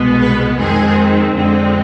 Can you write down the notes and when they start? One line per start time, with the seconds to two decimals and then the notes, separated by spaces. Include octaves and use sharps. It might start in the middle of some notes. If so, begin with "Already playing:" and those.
Already playing: C2 B2 G#3 B3
0.21 B4
0.59 F2 D#3 G#3 C4 G#4
1.34 F2 D3 G#3 C4